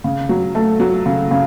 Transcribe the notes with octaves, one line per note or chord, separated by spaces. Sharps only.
C#3
F#3
A3
F#3
C#3
C#3